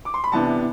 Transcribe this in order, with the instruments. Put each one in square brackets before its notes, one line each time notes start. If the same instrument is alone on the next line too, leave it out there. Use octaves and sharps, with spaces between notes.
[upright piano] D6
C6
B5
C3 E3 B3 D4 A5